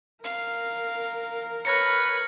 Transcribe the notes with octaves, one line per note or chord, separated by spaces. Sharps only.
A#4 F5
B4 C#5 F6 A#6 C#7